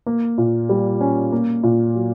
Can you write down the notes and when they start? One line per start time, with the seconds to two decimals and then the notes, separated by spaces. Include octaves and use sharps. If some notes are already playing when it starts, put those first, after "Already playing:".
0.06 A#3
0.38 A#2
0.69 G3
1.01 C#4
1.32 A#3
1.63 A#2
1.95 F#3